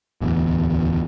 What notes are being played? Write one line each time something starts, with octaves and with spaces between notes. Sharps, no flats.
D1 E2